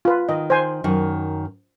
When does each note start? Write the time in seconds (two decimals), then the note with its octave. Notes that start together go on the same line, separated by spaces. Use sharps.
0.05 F4 B4
0.29 D#3 D#5
0.50 C5 G#5 C6
0.84 F#2 D#3